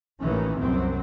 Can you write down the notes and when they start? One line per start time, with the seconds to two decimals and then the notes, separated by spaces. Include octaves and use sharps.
0.20 A1 A#2 D#3 E3 C#4
0.58 C2 F#2 F#3 C4